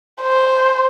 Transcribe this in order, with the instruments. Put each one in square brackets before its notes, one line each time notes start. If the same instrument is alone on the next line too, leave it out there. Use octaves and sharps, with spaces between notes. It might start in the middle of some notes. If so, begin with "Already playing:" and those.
[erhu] C5